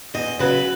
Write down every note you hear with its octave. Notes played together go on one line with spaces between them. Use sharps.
E2 D#5
C#3 F#3 B4